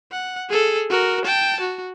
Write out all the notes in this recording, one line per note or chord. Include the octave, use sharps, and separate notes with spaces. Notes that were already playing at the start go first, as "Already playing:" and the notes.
F#5
G#4 A4
F#4 A#4
G5 A5
F#4